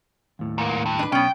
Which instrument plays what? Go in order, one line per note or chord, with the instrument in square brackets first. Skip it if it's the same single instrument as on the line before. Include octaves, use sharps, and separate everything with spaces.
[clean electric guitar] D#2 A2
[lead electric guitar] G#2 A#3
G2
[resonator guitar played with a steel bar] D4 B4
[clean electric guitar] B1 [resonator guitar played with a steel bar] B3 C#4 [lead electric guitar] G5